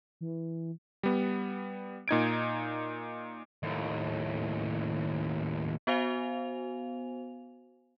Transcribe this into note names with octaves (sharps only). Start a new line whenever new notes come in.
E3
G3 B3
A#2 D#4 G#6 D7
D#2 A2
B3 F#4 C5 F5 G#5 F7